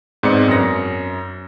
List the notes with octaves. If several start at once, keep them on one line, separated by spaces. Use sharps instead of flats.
G#2 B3 C4 D5 C#7
F#2 A#6